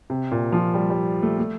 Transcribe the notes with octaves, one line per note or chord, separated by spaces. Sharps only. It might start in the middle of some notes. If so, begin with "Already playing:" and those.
C3
A#2
F3
G3
G3
A3
A3